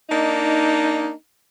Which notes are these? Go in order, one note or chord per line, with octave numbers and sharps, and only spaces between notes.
A#3 D4 D#4